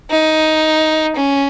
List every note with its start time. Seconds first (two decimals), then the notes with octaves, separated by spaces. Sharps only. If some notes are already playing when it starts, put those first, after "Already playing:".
0.11 D#4
1.16 C#4